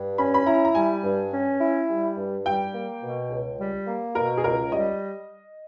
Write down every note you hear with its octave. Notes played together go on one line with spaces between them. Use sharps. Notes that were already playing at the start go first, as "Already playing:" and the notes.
Already playing: G2
C#4 B5
B5
E4 A#5
A#5
G3 G#5
G2
C#4
E4
G3
G2
G3 G5
A#3
B2
C#2
G3
A#3
B2 A#4
G#4
C#2 A#4
G3 D#5